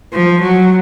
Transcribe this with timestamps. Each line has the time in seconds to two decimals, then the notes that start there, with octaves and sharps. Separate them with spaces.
0.13 F3
0.43 F#3